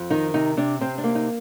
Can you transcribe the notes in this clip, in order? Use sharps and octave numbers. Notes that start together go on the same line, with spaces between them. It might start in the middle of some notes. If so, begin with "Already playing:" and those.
Already playing: F2
D#3 D#4
C3 D#4
C3 D4
C3 C4
D4
A#3
D#4